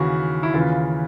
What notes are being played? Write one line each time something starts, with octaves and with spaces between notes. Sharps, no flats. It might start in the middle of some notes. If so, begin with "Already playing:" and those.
Already playing: D#2 C#3 E3 F#4
E4
D#2 C#3 E3 F4